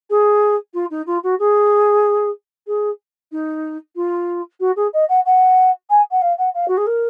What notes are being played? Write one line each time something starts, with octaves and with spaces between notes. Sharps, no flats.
G#4
F4
D#4
F4
F#4
G#4
G#4
D#4
F4
F#4
G#4
D#5
F#5
F#5
G#5
F#5
F5
F#5
F5
F#4
G#4
A#4